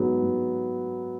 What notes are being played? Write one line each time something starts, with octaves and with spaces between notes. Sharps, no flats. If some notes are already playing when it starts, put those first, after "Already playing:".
Already playing: G#2 F#3 B3
G#2